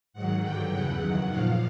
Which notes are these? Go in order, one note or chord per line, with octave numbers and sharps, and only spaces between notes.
G#2 D#3 F#3 F#5
G2 D3 F#3 G5
E2 C#3 E3 F#5
F#2 D#3 F#3
A#2 F3 F5